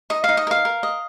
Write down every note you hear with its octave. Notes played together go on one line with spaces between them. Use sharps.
D#4 D#5
D#4 F5
D#5
A#4 F5
A#4
D#5